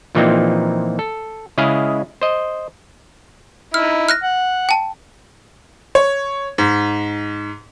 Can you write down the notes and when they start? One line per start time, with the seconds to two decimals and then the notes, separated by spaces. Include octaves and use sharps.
0.15 A#2 E3 F3 A#3 C4 D#4
0.99 A4
1.58 C#3 G#3 E4 G#4 D#5 F5
2.21 C5 D#5
3.74 D#4 E4 F6
4.09 F6 F#6 A#6
4.23 F#5
4.69 G5 A5
5.95 C#5
6.58 G#2